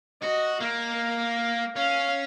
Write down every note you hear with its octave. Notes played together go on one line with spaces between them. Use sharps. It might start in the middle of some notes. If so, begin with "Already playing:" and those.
F#4 D#5
A#3 F5
C#4 F5